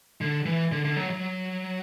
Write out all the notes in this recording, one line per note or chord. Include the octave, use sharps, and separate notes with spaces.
D3
E3
D3
D3
F#3
F#3